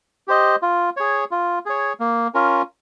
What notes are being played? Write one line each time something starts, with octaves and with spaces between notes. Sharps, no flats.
G4 C5 D#5
F4
G#4 C#5
F4
G#4 C#5
A#3
C#4 F4 A#4